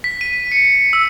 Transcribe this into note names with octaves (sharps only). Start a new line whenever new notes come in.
B6
D#7
C#7
E6